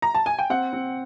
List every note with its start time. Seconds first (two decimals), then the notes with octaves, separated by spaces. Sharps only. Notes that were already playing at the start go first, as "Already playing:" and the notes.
0.02 A#5
0.15 A5
0.26 G#5
0.39 G5
0.50 C4 F#5
0.73 C4